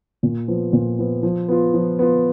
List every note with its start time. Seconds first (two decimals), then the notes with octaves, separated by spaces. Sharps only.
0.23 A#2
0.48 F3 B3
0.73 A#2
0.99 F3 B3
1.23 F3
1.48 B3 F4
1.74 F3
1.99 B3 F4